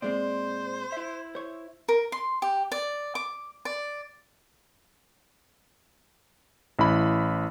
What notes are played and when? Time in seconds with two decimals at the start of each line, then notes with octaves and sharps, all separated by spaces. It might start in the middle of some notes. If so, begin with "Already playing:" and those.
0.02 A#2 G#3 C4 C5 D5
0.92 E4 E5
1.35 C5 C#5
1.88 A#4
2.12 C6
2.42 G4
2.72 D5
3.15 D6
3.65 D5
6.79 A1 E4 B5